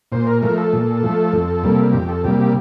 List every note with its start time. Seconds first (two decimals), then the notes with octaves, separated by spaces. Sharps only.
0.12 A#2 C5
0.27 A#4
0.42 F3 A3 A#4
0.58 A4
0.73 A#2
1.03 F3 A3
1.33 F2
1.64 C3 G3 A#3
1.93 F2 G4
2.09 A4
2.23 C3 G3 A#3 G4
2.40 G4